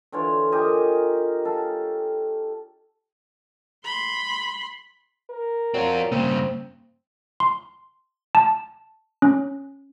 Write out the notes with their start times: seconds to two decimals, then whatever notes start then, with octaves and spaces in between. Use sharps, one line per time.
0.12 D3 E3 F4 C#5
0.52 G4 A#4 D#5 G#5
1.45 A4 F5
3.84 B5 C6
5.30 A#4
5.74 F#3 C4 F4 D5
6.12 G2 C#3 A#3 C4
7.40 C6
8.35 A5
9.22 C#4